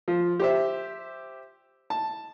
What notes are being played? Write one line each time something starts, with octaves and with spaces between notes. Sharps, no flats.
F3
G4 C5 E5
A5